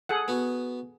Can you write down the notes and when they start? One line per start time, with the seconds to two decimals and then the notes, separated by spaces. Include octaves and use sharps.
0.09 G#4 A4 F#5
0.28 B3 F#4